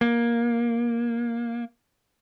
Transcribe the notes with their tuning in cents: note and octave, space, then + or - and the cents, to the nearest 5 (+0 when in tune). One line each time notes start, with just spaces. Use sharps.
A#3 +15